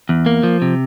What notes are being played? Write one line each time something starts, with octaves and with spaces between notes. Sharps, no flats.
E2
A#3
F3
C3